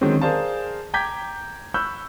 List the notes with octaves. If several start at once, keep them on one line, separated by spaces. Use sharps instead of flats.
D3 D#3 F#3 G#3 C4 C#4
G#4 A#4 C5 D5 F5 A5
G5 A#5 D6 G6 G#6 B6
B5 C#6 E6 F#6 G6